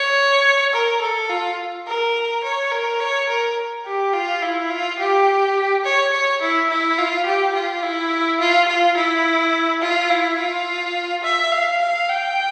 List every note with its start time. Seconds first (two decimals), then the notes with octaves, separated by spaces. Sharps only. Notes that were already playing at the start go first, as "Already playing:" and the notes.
Already playing: C#5
0.73 A#4
1.01 A4
1.30 F4
1.87 A#4
2.43 C#5
2.71 A#4
3.00 C#5
3.29 A#4
3.86 G4
4.13 F4
4.42 E4
4.70 F4
4.99 G4
5.84 C#5
6.13 C#5
6.41 E4
6.70 E4
6.98 F4
7.26 G4
7.55 F4
7.83 E4
8.40 F4
8.68 F4
8.97 E4
9.82 F4
10.10 E4
10.38 F4
11.23 E5
11.52 F5
11.81 F5
12.09 G5